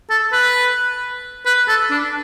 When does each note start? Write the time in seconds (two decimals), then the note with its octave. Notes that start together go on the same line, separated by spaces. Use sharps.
0.10 A4
0.32 B4
1.46 B4
1.68 A4
1.91 D4